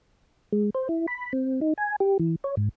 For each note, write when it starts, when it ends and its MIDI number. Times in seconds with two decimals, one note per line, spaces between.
0.53 0.70 56
0.75 0.88 72
0.89 1.06 64
1.08 1.33 83
1.33 1.60 60
1.61 1.73 63
1.78 1.96 80
2.00 2.18 67
2.20 2.36 52
2.44 2.55 73
2.57 2.69 44